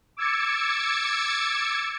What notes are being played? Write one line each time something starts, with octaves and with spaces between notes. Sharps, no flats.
D6 E6 G#6 A6 C#7